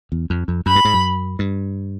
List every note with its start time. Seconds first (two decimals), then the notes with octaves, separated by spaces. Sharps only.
0.12 E2
0.30 F2
0.48 F2
0.66 F#2 B5
0.76 G2
0.85 G#2
0.94 F#2
1.39 G2